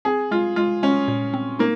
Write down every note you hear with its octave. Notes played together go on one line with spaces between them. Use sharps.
C4 G#4
G#3 F4
G#3 F4
G#3 C#4
A#2
C4
A#3 D#4